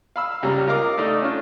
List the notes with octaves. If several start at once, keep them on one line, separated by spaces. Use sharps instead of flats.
F5 B5 E6
C#2 G3 A#5
F4 A#4 D#5 F5 A#5 D6
A3 D#4 D5 D#5
C#4 D4 F4